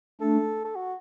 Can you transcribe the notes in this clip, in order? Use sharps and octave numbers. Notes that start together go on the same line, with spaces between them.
A3 D4 A4
A4
F#4